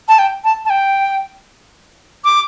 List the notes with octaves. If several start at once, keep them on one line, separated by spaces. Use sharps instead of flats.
A5
G5
A5
A5
G5
D6